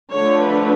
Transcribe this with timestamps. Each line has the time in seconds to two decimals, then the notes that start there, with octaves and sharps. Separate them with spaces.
0.12 D3 F3 A3 C#5
0.43 B4